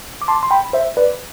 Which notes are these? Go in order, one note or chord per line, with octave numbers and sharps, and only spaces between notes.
D6
A5 C6
C6
G5 B5
C5 E5
B4 D5